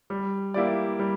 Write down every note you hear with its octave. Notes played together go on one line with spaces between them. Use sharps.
G3
A#3 E4 G4 D5
G3